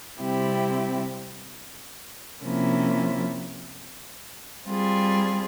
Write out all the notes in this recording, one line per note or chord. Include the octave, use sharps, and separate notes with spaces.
C3 G3 C4 E4 G4
C3 F3 A#3 C#4 E4
G3 C4 F4 G#4